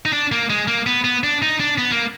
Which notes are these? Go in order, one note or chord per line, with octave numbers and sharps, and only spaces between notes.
D#4
D4
A#3
G#3
A#3
B3
B3
D4
D#4
D4
B3
A#3